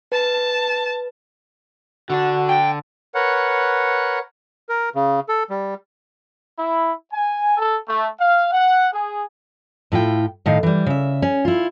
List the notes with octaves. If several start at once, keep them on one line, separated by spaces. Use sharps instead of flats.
B4 A5
D3 D4 F#4
G5
A#4 B4 C#5 F#5
A#4
C#3
A4
G3
E4
G#5
A4
A3
F5
F#5
G#4
A2 E4 F4 G5
A2 D#3 F5
E3 G3
C#3 E5
C#4
E4 F4